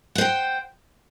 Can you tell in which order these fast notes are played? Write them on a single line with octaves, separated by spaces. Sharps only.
F#5 C5 G5